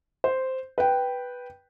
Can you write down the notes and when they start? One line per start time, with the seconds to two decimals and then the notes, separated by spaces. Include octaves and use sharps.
0.24 C5
0.78 B4 G5